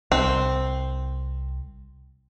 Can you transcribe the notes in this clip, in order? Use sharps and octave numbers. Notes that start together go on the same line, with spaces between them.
C2 C4